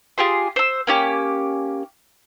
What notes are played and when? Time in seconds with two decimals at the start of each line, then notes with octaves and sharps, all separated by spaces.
0.18 F4 G4 G#4 C6
0.56 C5 E6
0.87 A#3 C#4 G4